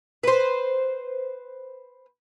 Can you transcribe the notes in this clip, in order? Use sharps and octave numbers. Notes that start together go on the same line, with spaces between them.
B4 C5